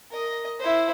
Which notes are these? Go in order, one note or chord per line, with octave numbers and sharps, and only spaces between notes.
A#4 D#5
E4 C5